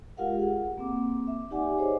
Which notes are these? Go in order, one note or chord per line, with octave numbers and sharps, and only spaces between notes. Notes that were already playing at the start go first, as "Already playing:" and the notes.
G#3 F4 G4 A#4 F5 F#5
G#4 F#5
A#3 C4 D6
E5
D#4 G4 D5 F#5 G#5 D6
G#4 C5 C#5 D#5